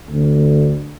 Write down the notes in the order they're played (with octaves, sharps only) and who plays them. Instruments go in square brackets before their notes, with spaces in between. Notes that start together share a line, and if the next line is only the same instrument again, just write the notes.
[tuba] D2